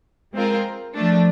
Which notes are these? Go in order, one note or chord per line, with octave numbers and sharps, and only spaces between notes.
G#3 C4 F4 A#4
F3 A3 D4